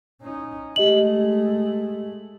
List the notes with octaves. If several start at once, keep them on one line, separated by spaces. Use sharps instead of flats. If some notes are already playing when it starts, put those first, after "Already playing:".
C#4 D#4
G#3 A3 G4 D#5 F#7